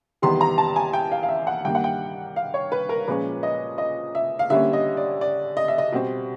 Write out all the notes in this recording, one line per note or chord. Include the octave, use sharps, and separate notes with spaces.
E2 C3 D#3 G3 B3 C6
A#5
A5
G#5
G5
F5
F5
E5
F#5
G2 D#3 G3 A#3 G5
F#5
G5
F5
C#5
B4
A#4
A#2 F3 G#3 C#4 B4
D#5
D#5
E5
F5
D3 G3 A#3 C#4 E5
D#5
D5
D5
D#5
E5
D#5
B2 G3 C4